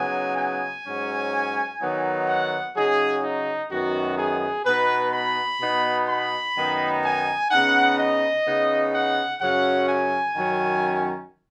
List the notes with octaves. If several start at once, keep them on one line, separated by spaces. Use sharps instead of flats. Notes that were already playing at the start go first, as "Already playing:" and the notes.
Already playing: C#3 F#3 B3 D#4 G#5
G#5
G#2 F#3 C#4
D#3 F#3 B3 D#4
F#5
C#3 F#3 D#4 G#4
D#4
F#2 D#3 B3 D#4 F#4
G#4
B2 B3 D#4 B4
B5
B2 B3 D#4
B5
F#2 D#3 B3 D#4
G#5
C#3 B3 D#4 F#5
D#5
C#3 B3 D#4
F#5
F#2 C#3 F#3 C#4 F#5
G#5
F#2 D#3 F#3 C#4